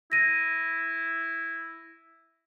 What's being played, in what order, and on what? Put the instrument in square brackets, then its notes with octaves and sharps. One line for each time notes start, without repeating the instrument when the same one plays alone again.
[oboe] E4 [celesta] A#6 D#7